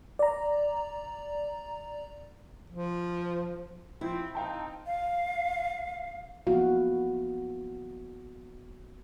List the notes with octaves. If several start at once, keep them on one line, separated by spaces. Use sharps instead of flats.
D5 A#5
F3
F3 C4 E4
C4 D#4 F5 G5 A5
F5
F3 A#3 B3 E4 F#4 F5